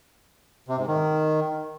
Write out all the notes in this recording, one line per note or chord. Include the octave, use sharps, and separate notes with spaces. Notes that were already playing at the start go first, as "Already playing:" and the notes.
C3
G#2
D#3